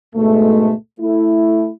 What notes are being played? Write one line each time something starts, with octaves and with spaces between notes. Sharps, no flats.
D2 G#2 B2 G#3 A3
A3 E4